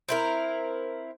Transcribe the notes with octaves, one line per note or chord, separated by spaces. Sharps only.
C4 E4 A#4